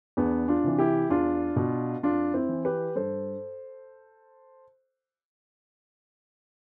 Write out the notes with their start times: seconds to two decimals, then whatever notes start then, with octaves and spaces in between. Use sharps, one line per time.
0.17 E2 B3 D4
0.48 D4 F4
0.64 C3 E3
0.79 E4 G4
1.10 E2 D4 F4
1.56 B2
2.03 F2 D4 F4
2.34 C4 E4
2.49 E3
2.65 G4 B4
2.95 G2 A4 C5